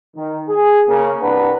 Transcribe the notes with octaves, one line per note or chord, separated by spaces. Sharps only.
D#3
G#4
C#3 A#3
C2 D4 B4 F#5 A#5